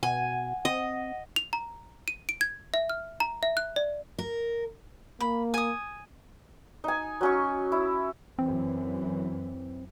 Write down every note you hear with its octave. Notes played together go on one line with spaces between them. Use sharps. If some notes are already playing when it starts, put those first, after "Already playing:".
B2 F#5 G#5
C4 D#5
F7
A#5
D#7
D7
G#6
E5
F6
A#5
E5
F#6
D5
A#4
A#3 B5
G#5 D#6
D#4 G#5
F#3 C#4 C#6
E4
F#2 E3 C4